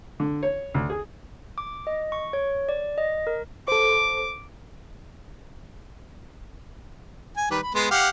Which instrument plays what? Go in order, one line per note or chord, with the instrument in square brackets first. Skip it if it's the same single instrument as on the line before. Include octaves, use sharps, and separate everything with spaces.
[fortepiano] D3
C#5
D2
G#4
[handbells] D6
D#5
C#6
C#5
D5
D#5
A#4
[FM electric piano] A4 C5 [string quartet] D6
[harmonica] G#5
D#3 G3 B4
B5
G#3 B3 C6
G4 F5 F#5